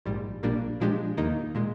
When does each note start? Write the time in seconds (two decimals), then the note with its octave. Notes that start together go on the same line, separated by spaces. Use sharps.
0.05 A#1 G#2 G3
0.43 A#1 A#2 G3 A#3 D4
0.80 A#2 F3 G#3 D4 G4
1.17 D#2 D#3 A#3 D#4
1.55 A#2 G#3